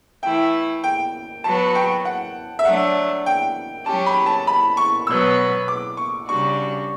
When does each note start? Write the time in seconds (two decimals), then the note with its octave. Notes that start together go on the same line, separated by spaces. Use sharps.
0.23 E3 A3 E4 G5
0.84 G5
1.44 F#3 B3 F#4 A5
1.75 G5
2.05 F#5
2.59 E5
2.65 F#3 A3 D4 F#5
3.26 G5
3.86 F#3 C#4 G4 A5
4.06 B5
4.26 A5
4.47 B5
4.77 C#6
5.07 B2 F#3 B3 E6
5.68 D6
5.97 C#6
6.28 C#3 G3 D4 F#4 C#6